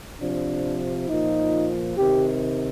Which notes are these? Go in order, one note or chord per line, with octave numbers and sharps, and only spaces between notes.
C3 F3 D4
A#2 F3 D#4
C3 D#3 G4